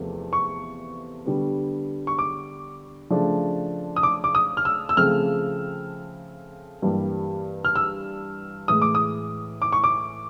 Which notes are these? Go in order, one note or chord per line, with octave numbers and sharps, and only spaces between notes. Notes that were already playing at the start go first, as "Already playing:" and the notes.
Already playing: E2 C3 F3 A3
C#6
D3 G3 B3
C#6
D6
C#3 F3 A3 D4
D#6
D6
D6
D#6
F6
E6
E6
C#3 F3 A3 C4 F6
G2 E3 G3 A#3
F6
E6
A2 E3 G#3 D#6
D6
D#6
D6
C#6
D6